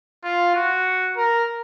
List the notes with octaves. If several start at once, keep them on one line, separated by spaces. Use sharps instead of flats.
F4
F#4
A#4